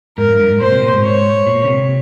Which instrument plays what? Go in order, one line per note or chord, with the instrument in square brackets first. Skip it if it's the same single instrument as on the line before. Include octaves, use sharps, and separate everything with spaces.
[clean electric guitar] G#2 [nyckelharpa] A#4
[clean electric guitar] G2
G2
G#2
[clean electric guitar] A#2 [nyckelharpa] C5
[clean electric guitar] C3
A#2
G#2
[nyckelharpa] C#5
[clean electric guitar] A#2
C#3
C3